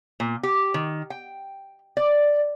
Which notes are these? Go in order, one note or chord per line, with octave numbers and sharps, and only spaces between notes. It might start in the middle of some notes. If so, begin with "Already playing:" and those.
A#2
G4
D#3
G5
D5